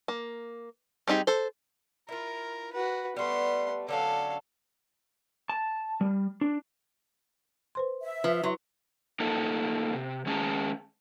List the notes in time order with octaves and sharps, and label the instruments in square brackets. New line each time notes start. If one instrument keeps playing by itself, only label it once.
[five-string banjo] A#3
G3 C4 D#4 G4 G#4
A4 C5
[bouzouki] E4 F4 [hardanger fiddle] A#4
[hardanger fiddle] F#4 B4
[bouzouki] G3 A3 [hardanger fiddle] B3 C6
[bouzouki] D3 F#3 C#4 [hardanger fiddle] A4 F5
[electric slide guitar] A5
G3
D4
[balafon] B4 C5 C6
[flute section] E5
[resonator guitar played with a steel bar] F3 [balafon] B4
[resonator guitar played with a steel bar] F#3 [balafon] E4 B4 C6
[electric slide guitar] A#3 D#4 F4 A4
C3
D#3 G#3 C#4 G#4 A5 A#5